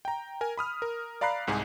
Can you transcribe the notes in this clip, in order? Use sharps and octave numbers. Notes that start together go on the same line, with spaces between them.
G5 A#5
A#4 G#5
B5 D#6 F6
A#4
D5 F5 A#5 B5 F#6 C7
C2 G#2 G#4 G#5